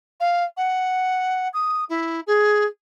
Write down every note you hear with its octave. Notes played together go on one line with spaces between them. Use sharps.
F5
F#5
D#6
E4
G#4